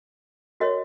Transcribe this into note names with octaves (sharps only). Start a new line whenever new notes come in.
F#4 A#4 C#5 D#5